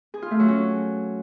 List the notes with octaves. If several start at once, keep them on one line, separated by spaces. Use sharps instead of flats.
G#4
F4
A3
F#3
C#4